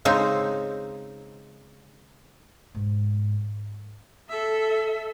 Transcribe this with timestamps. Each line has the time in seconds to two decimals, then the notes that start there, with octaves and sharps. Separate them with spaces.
0.05 C#3 G#3 C4 D#4
2.75 G#2 B2
4.29 A4 E5